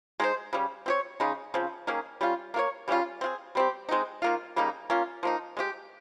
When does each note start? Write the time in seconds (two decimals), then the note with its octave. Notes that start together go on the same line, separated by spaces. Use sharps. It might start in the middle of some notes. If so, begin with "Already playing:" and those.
0.20 G#3 D#4 G#4 C5
0.53 C#3 G3 C#4
0.86 C4 G4 C#5
1.20 C#3 G#3 D#4
1.54 C#3 F3 C4
1.87 D#3 A#3 C#4 G#4
2.21 G3 C#4 F4
2.54 A#3 F4 A#4 C#5
2.88 C#3 G3 C#4 F4
3.21 C4 F4 G#4
3.55 G3 C4 G4
3.89 G#3 C4 D#4
4.22 D#3 A#3 F4
4.56 C#3 G3 A#3 D#4
4.90 A#3 C#4 F4
5.23 F3 A#3 D#4
5.57 G#3 C#4 G4